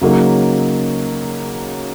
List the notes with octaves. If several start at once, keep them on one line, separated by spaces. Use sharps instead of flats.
C#3 F#3 A#3 D#4